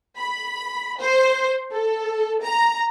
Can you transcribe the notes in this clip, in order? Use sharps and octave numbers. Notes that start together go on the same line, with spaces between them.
B5
C5
A4
A#5